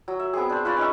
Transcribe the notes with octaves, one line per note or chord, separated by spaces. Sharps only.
F#3
E5
B3 C4 G#4
D4 C5
F4 B4 C#5 D5
C#4 D#4 C#5 E5